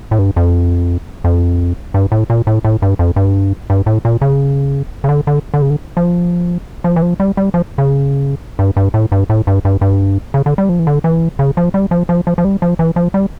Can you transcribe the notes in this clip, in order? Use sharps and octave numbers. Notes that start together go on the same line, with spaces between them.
A2
G2
F2
F2
G2
A2
A#2
A2
A2
G2
F2
G2
G2
A2
A#2
C#3
C#3
D3
D3
D3
C#3
D3
F3
F3
E3
F3
G3
G3
F3
C#3
G2
G2
A2
G2
A2
G2
G2
G2
C#3
D3
G3
F3
E3
D3
E3
C#3
F3
G3
F3
F3
F3
F3
G3
F3
E3
F3
G3